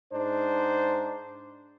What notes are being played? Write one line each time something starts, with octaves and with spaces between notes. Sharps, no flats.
G#2 D4 D#4 C5